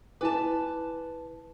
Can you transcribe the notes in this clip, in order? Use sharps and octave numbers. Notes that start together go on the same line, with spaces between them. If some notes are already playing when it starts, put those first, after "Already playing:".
E4 B4 G#5 A5 D6